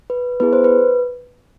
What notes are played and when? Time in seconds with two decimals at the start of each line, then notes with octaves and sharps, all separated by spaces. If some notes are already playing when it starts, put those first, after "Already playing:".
0.10 B4
0.40 B3 E4 G#4 B4
0.53 C5
0.64 B4